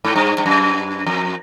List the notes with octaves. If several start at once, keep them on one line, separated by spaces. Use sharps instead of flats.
G#2
G2
G2
F#2
F2